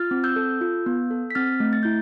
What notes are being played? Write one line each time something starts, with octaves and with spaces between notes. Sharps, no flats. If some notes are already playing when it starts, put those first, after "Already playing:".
Already playing: F4 F6 A6
C4
E6 G6
A4
F4
B3
A4
B6
C4 F6 A6
A3
A6
E4 G6